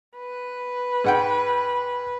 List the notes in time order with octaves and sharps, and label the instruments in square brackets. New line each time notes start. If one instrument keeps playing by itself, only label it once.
[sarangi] B4
[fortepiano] G#2 F#5 G5